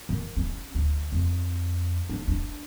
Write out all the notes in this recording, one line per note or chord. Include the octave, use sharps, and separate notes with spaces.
D#3
C#4
D2
F2
D4
D4